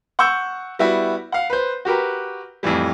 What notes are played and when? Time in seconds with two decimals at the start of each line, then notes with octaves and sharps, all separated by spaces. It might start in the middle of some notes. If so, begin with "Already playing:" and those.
0.19 F#5 C#6 E6 G6
0.79 G3 B3 E4 F#4
1.32 F5 F#5
1.50 B4 C5
1.85 F#4 G4 A#4 B4
2.63 F2 A2 E3 G3